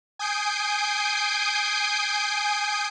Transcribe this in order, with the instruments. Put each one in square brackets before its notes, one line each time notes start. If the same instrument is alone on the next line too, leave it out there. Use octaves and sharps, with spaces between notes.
[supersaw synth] G#5 D#6 G6 C7 D7